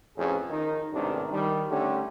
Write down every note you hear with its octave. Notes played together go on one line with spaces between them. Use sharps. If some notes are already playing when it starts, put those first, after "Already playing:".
A1 F2 C#4 G#4
D#3 D#4
A1 G#2 C3 D#3 D4
D#3 G3
D3 A3 C#4 G4